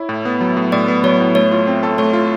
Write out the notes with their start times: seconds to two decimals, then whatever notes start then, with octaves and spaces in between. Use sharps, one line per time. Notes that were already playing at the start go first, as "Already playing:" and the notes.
Already playing: E4 C#5
0.09 A2
0.25 B3
0.41 F#3
0.57 A2
0.72 A2 D5
0.88 B3
1.04 F#3 C#5
1.20 A2
1.35 A3 C#5
1.51 F4
1.67 C4
1.83 A4
1.98 A3 C#5
2.13 F4